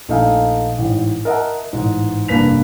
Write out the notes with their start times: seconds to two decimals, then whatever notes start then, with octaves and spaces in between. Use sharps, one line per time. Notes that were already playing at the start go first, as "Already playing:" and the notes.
0.08 A#1 A3 D#4 F5 G#5
0.78 A1 G#2
1.25 A#4 D#5 E5 F#5 A5
1.73 A1 G#2
2.28 F1 G2 A#3 B4 B6 F7